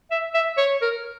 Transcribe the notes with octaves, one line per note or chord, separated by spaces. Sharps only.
E5
E5
C#5
A#4